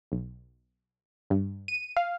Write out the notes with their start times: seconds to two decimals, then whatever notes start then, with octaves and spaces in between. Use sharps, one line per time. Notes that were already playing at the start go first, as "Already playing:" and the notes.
0.12 B1
1.30 G2
1.68 D#7
1.97 F5